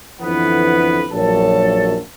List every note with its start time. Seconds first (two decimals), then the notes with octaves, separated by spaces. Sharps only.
0.21 F2 D3 E3 B3 B4
1.12 A#1 F#2 F#3 A4 A5